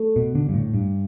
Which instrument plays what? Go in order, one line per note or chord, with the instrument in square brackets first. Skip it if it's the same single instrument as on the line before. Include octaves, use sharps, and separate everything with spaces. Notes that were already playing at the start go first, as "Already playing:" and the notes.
Already playing: [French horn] A3
[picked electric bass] B2
D3
G2
A2
G2